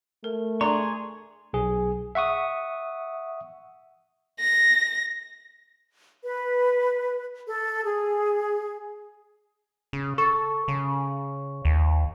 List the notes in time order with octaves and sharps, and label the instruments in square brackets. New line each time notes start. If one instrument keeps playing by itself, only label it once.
[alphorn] A3 [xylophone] A#4
[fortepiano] D4 [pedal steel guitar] G#4 C6 C#6 [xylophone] A#5
[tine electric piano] B1 G#4
E5 F#5 C#6 D#6
[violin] A#6
[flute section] B4
A4
G#4
[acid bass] C#3
[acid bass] A4 [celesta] C#6
[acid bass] C#3
D#2